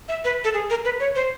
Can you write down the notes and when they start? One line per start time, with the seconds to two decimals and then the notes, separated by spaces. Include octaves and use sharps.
0.09 E5
0.24 B4
0.44 A4
0.54 G#4
0.70 A#4
0.85 B4
1.00 C#5
1.15 C5